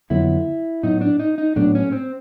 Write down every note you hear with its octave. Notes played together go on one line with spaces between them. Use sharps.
F2 D3 F#3 B3 E4
A2 F#3 B3 D#4
D4
D#4
D#4
A2 F#3 B3 D4
C#4
C4